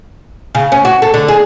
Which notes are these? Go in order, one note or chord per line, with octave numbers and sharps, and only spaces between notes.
C#3
C#4
F#4
A4
D3
G#4